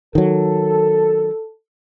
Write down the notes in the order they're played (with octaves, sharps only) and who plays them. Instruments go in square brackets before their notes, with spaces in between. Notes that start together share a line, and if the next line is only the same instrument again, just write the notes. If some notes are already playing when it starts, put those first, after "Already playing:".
[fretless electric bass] D#3 F#3 [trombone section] A4